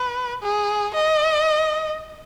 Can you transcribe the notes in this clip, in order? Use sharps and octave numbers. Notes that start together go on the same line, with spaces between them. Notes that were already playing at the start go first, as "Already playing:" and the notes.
Already playing: B4
G#4
D#5